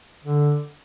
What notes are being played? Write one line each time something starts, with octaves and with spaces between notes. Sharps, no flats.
D3